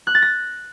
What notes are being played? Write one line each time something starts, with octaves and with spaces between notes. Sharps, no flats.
F#6
A6
A#6